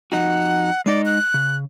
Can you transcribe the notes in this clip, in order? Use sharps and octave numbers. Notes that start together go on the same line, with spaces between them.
F2 D#4 F#4 F#5
G#3 D#4 D5 D#5
F#6
C#3